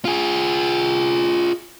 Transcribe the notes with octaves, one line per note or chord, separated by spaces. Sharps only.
F4 G#4